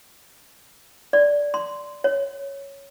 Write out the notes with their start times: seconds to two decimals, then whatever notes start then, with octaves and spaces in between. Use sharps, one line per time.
1.13 D5
1.54 C6
2.04 C#5